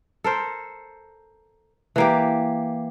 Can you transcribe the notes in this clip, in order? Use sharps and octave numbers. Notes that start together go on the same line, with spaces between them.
A4 A#4 C5
E3 A#3 G4